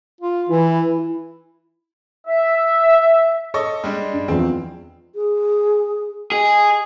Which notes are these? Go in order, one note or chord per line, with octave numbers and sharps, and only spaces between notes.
F4
E3 E4
E5
A4 C#5 D#5 C#6
G3 G#3 D4
G2
E2 F3 C4
G#4
G#4 D#5